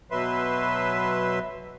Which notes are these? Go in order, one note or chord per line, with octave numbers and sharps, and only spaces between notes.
B2 F#3 B4 E5 C6